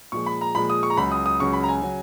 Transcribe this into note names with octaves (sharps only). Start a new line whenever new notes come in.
A#2 F3 G#3 C#6
B5
A#5
A#2 F3 G#3 B5
D#6
C#6
A#5
C#2 C#3 F#3 B5
D#6
D#6
C#2 C#3 F#3 C#6
B5
A#5
G#5
C#3 F#3